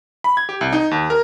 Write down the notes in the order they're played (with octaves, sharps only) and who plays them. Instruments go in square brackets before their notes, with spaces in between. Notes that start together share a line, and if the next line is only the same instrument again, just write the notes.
[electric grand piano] B5
G#6
G4
C2
D#4
D#2
A#4